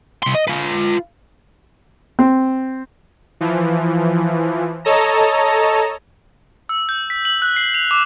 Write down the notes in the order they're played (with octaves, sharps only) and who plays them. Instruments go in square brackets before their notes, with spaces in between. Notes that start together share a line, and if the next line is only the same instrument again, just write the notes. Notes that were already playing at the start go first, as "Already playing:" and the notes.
[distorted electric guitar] C2 C6
D#5
F4 B4
[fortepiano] C4
[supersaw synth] E3 F3
A4 C#5 D#5 A5 A#5
[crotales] E6
G6
B6
F#7
F#6
C7
F7
D6